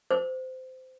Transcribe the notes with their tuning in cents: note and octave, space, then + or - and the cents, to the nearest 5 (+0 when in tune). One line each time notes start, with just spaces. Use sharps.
C5 -20